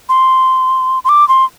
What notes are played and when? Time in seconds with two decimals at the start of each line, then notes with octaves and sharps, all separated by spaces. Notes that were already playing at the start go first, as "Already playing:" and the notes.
0.09 C6
1.04 C6
1.09 D6
1.28 C6